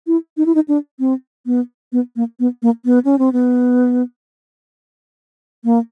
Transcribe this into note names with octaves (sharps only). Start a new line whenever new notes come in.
E4
D#4
E4
D#4
D4
C4
B3
B3
A#3
B3
A#3
B3
C#4
C4
B3
A#3